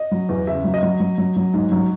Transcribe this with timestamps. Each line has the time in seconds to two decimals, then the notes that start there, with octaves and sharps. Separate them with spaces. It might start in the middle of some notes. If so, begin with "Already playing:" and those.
Already playing: D#5
0.12 F#3
0.29 E2
0.47 C#3 E5
0.64 F#3
0.74 D#5
0.83 F#3
1.00 F#3
1.18 F#3
1.36 F#3
1.54 G#2
1.72 F#3